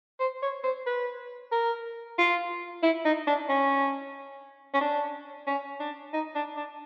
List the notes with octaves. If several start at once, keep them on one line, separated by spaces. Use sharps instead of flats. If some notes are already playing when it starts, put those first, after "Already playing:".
C5
C#5
C5
B4
A#4
F4
E4
D#4
D4
C#4
C#4
D4
C#4
D4
D#4
D4
D4